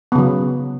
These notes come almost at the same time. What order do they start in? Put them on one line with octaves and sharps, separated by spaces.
B3 C#3 F#3